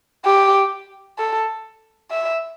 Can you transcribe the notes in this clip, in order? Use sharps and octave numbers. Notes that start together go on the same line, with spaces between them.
G4
A4
E5